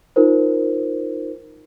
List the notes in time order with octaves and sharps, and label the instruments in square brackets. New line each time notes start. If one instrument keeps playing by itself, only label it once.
[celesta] D#4 F4 A#4 C5